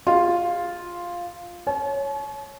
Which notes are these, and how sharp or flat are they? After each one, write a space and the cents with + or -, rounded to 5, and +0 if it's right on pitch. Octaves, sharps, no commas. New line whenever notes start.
F4 +0 G#4 -35
C#5 +0 A5 -45